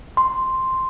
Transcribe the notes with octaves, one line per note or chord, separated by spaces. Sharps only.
C6